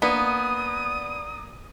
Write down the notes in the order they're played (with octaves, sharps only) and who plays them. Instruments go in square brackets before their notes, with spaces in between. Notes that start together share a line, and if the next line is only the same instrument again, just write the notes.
[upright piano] A#3 D4 D5 [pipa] B3 [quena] D#6